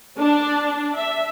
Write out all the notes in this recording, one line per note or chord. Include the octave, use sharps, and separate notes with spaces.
D4
E5